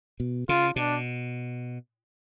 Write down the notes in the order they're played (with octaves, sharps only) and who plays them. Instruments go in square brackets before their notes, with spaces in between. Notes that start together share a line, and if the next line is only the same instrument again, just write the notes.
[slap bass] B2
[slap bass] C#3 [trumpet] F4
[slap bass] B2 [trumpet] D4